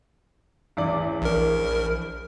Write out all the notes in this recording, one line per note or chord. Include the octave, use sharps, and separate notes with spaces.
A1 E2 D5
A#1 A#4